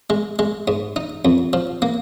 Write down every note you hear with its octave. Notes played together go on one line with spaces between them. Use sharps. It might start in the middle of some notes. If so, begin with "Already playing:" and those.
G#3
G#3
G#2
D#4
F2
F3
A#3